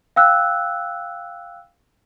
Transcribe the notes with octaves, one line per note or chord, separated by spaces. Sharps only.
F5 G5 E6 F#6